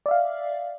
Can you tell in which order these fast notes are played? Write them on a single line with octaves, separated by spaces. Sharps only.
D5 E5 F5